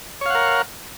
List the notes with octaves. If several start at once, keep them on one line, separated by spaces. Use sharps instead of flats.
A#4 C#5 F5 F#5